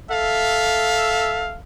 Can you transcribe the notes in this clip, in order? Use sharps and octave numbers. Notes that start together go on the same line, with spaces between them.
A4 E5 F5